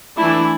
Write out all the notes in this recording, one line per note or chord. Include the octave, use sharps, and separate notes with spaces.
E3 A3 D4 E4